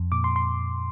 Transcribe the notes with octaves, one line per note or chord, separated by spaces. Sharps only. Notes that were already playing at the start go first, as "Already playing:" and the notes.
Already playing: F2
A#2 D6
C6
C6